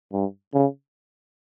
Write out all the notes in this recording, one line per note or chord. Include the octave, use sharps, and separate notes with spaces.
G2
C#3